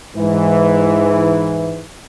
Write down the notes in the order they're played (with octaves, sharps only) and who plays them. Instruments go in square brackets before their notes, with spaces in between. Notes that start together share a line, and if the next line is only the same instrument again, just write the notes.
[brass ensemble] G#2 E3